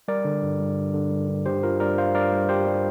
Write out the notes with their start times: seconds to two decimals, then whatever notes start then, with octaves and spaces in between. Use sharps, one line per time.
0.08 G3 A#4 D5
0.25 D3
0.42 G2
0.59 G2
0.77 G3
0.94 D3
1.11 G2
1.29 G2
1.46 G2 G4 C5
1.63 G3 F4 A#4
1.80 G2 A#4 D5
1.97 G3 C5 F5
2.15 G2 A#4 D5
2.32 G3
2.49 G2 G4 C5
2.67 G3